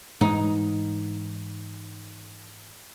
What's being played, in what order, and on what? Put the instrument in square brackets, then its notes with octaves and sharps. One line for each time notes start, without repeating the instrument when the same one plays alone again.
[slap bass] G#2 E3 G#3 [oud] D#4